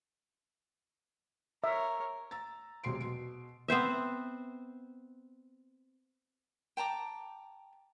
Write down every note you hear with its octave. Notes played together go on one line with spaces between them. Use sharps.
A#4 C#5 E5
A#5 E6 A6
E1 C3 F#3 C6 C7 D7
B2 C6 D7
B3 C4 C5 E5
G5 A5 A#5 D6